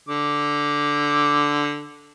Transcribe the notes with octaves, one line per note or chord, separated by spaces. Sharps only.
D3 D6